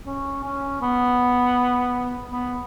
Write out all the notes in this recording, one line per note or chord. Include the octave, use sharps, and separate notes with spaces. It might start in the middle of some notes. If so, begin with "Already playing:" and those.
C#4
C#4
B3
B3